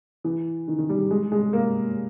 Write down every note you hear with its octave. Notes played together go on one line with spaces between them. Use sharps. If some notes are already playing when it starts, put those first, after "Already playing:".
E3
D#3
D#3
G3
G#3
G#3
A#3